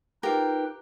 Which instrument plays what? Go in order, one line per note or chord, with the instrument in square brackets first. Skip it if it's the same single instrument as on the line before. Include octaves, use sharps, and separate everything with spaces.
[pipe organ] D#4 B4 [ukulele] F4 A#4 [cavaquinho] G4